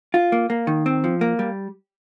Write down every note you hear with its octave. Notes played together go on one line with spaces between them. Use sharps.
F4
A#3
A#3
D#3
C4
F3
A#3
G3